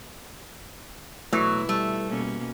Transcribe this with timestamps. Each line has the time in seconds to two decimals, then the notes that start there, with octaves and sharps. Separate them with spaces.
1.33 B2 E3 F#3 A3 E4
1.69 G3 A3
2.08 B2 A#3 C#4